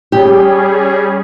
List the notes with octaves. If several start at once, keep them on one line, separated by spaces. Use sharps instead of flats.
G3 C#4 G4 G#4